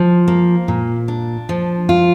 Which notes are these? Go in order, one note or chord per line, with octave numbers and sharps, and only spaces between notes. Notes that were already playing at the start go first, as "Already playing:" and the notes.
Already playing: F3
A#3
A#2
D4
F3
F4